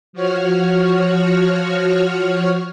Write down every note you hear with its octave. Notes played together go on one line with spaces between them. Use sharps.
F3 F#4 C#5 F6